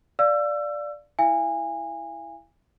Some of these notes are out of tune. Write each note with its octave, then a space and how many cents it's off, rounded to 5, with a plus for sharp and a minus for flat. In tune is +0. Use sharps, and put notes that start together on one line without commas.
D5 +0 F5 +0 E6 +30
E4 +0 F5 -35 G#5 -25